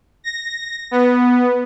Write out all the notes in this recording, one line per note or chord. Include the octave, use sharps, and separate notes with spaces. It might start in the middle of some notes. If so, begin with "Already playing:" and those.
A#6
B3